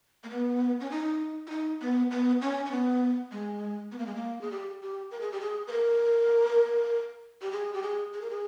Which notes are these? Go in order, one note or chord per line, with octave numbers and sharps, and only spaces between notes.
A#3
B3
C#4
D#4
E4
D#4
B3
B3
C#4
C#4
B3
G#3
B3
A#3
G#3
A#3
G#4
G4
G4
A#4
G#4
G4
G#4
B4
A#4
G4
G#4
G4
G#4
G#4
A#4
G#4